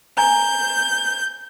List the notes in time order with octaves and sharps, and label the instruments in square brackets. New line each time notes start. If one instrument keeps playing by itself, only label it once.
[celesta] G#5 A#5 [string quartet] G6